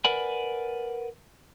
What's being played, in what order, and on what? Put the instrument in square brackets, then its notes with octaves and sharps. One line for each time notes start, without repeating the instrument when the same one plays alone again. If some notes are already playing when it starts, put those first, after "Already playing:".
[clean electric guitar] A#4 B4 D5 F#5 G#5 B5